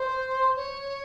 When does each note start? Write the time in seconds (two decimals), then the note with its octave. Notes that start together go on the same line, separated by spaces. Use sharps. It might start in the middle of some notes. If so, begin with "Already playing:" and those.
Already playing: C5
0.56 C#5